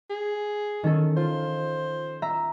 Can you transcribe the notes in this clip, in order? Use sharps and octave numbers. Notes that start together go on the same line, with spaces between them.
G#4
D#3 C#4 A4
F4 C5
E5 A#5